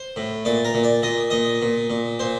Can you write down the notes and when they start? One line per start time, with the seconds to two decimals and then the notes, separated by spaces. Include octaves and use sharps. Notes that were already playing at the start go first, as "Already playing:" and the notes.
Already playing: C5
0.16 A2
0.45 A#2 D5
0.65 A#4
0.74 A#2
0.83 D5
1.03 A#2 D#5
1.30 A#2 D#5
1.62 A#2
1.90 A#2
2.19 A#2 C5